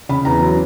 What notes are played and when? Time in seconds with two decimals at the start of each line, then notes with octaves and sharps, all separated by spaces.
0.09 C#3 B5
0.25 E2 A#5
0.41 F#3